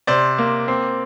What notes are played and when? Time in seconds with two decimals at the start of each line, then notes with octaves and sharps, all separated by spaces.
0.07 C3 C5 D5
0.38 A#3
0.68 C4